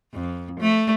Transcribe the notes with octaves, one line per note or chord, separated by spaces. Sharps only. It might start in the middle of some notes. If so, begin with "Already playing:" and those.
F2
A3